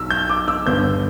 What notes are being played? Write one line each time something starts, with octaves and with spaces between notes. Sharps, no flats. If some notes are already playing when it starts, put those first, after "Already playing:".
Already playing: B1 E6
G6
D6
E6
G1 G2 D3 B3 G6